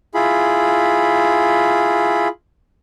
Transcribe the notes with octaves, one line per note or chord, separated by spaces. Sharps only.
E4 F4 G#4 B5